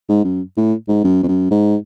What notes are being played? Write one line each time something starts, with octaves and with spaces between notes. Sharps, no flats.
G#2
F#2
A2
G#2
F#2
F2
F#2
G#2